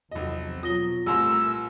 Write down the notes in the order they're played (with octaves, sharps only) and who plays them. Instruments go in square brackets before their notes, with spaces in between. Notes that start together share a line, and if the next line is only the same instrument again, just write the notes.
[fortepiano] B1 D#5 [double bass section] E2 C3 F3
[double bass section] B2 F#3 [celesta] F4 A#6 G7 [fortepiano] D#6
[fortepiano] C2 A#5 C6 [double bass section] A#2 A3 [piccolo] E6